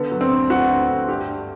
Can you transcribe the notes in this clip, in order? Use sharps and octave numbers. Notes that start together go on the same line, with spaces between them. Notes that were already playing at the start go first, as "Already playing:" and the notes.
Already playing: D3 B3
F#3
C4
D2
D2 F#4
D2
D2
G2 G4
G2